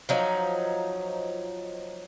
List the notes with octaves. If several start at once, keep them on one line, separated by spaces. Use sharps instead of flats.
F3 F#3 D#4